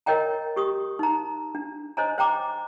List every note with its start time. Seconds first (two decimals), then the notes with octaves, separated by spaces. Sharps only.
0.06 A#4 C#5 D#5 G5 A#5
0.56 G4 C#6 D#6
0.99 D#4 A#5
1.55 D4
1.97 C5 C#5 D#5 G#5 A#5
2.18 C5 G5 A#5 D6